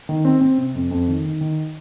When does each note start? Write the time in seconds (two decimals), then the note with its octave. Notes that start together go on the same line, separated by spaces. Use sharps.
0.09 D#3
0.25 C4
0.41 C4
0.58 C3
0.75 F2
0.91 F2
1.08 D#3
1.25 D#3
1.41 D#3